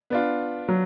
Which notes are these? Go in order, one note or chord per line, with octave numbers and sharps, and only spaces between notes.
B3 D4 F4
F#3